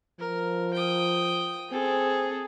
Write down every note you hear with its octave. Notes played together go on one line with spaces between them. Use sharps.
F3 A#4
G5 D#6
C4 G#4 A4